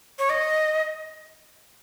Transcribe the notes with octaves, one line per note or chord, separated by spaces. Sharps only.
C#5
D#5